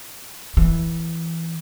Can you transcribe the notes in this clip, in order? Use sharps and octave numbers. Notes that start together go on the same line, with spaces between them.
E3